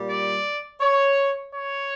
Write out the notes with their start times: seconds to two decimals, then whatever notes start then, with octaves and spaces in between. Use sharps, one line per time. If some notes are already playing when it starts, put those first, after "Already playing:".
Already playing: A#2 G3
0.08 D5
0.80 C#5
1.53 C#5